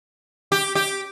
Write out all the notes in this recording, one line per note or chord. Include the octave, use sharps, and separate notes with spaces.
G4
G4